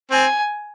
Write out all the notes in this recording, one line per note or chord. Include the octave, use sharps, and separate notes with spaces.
C4 G#5